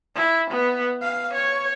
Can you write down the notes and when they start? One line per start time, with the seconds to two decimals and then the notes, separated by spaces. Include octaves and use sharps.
0.15 E4
0.51 B3
1.02 F5
1.34 C#5